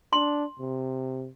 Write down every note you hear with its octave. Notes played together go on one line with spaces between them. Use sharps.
D4 C6
C3